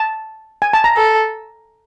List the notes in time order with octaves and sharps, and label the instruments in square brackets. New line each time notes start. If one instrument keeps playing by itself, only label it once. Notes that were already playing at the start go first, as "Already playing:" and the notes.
Already playing: [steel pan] A5
G#5
A5
A#5
[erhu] A4